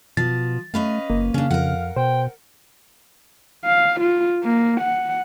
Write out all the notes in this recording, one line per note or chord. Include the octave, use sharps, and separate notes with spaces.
B2 F3 A6
A3 C#4 B4 D#5 F5
F#1 A#3
C#3 C#4 D4 F5
F2 A#4 F#5
B2 C5 G5
F5
F4
A#3
F#5